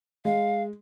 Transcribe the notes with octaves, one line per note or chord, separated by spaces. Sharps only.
G#3 F5